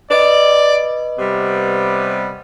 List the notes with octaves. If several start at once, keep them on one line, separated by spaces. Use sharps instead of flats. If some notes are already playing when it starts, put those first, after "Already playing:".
B4 D5 D#5
C3 G3 B3